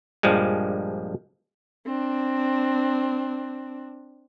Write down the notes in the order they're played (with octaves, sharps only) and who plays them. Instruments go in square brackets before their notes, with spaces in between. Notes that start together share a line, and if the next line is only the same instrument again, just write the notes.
[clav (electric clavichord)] A#1 G2 F3 G3 G#3
[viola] C4 D4